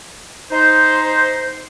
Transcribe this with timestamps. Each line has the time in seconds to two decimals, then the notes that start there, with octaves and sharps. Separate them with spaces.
0.51 D#4 C5